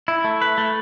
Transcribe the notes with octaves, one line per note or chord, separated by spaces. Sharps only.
E4
A3
B4
A3